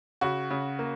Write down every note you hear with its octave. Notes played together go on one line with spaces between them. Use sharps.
C#3 F#4
C#3
A#3